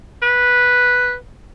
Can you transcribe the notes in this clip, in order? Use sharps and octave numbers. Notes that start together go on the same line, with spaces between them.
B4